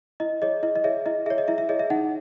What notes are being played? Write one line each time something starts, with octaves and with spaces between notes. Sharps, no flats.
E4 D#5
G#4 C#5 D#5
E4 D#5
D#5
G#4 C#5 E5
E4 D#5
G#4 C#5 E5
D#5
E4 E5
E5
G#4 C#5 D#5
E5
D#4 F#5